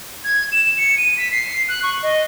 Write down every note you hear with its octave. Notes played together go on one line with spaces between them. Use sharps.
G#6
E7
C#7
D#7
B6
C7
F#6
C#6
D#5